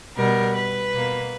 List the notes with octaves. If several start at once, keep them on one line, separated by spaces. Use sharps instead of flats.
B2 G3 B3 A#4
B4
B2 A#3